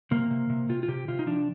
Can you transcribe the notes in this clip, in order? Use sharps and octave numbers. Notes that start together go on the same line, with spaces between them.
C3 A#3
C3
C3
C3 F4
F4
C3 G4
C3 F4
D#4
F3 D4